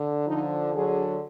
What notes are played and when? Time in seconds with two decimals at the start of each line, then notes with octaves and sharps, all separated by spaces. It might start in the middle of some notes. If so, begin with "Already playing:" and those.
Already playing: D3
0.26 D3 F3 D#4
0.74 D3 F#3 G#4